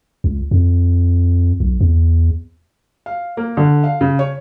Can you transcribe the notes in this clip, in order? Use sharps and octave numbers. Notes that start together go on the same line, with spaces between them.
C#2
F2
B1
E2
F5
A#3
D3
F5
C#3
C#5